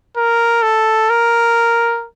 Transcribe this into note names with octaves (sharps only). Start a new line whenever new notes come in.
A#4
A4
A#4